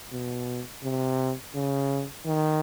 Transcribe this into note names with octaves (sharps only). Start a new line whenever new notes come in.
B2
C3
C#3
D#3